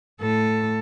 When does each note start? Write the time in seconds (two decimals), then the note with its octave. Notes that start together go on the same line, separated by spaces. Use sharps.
0.21 A2 A4